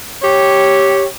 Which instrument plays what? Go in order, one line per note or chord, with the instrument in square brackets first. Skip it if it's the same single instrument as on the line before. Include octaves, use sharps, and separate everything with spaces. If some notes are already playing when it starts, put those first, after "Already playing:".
[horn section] G4 C#5